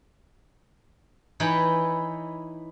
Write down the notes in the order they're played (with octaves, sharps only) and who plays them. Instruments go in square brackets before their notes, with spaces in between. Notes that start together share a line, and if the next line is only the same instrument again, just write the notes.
[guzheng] E3 D#4 B4 C#5 G5 B5